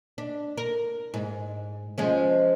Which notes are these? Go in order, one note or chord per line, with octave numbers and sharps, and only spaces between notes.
D4
A#4
G#2
F3 G#3 C#4